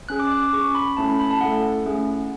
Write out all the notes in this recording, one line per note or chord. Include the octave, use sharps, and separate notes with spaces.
C#4 G#4 F#6
D6
F#6
D6
C#4 G#4 C#6
B5
A3 C#4 E4 A4 A5
B5
B5
A5
A3 C#4 E4 A4 F#5
A3 C#4 E4 G#4